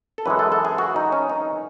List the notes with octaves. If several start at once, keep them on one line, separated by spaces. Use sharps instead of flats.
A4
F#2 E3 G#3 B4
A4
A4
G#4
F#4
D#4
C#4
D#4